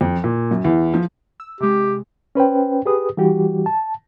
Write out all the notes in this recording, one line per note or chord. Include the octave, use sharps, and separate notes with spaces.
F2
A#2
F#2
E2
F3
E6
C3 G#3 G4
C#4 B4 C5 G5
G4 G#4 B4 D#6
E3 G3 F#4 G4
A5